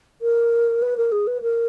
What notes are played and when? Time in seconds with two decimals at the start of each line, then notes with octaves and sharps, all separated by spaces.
0.21 A#4
0.82 B4
0.97 A#4
1.11 G#4
1.27 B4
1.42 A#4